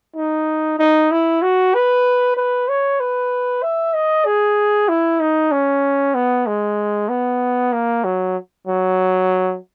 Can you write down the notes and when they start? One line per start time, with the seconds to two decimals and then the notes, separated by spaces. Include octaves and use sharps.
0.16 D#4
0.79 D#4
1.11 E4
1.42 F#4
1.74 B4
2.37 B4
2.68 C#5
3.00 B4
3.63 E5
3.94 D#5
4.25 G#4
4.89 E4
5.21 D#4
5.52 C#4
6.15 B3
6.47 G#3
7.09 B3
7.73 A#3
8.04 F#3
8.67 F#3